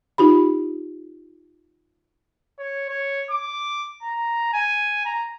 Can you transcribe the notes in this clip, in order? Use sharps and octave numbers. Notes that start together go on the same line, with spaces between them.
D#4 F4 G4 B5
C#5
C#5
D6
A#5
G#5
A#5